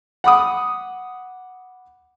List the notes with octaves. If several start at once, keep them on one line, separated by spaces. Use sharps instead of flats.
F#5 B5 D6 D#6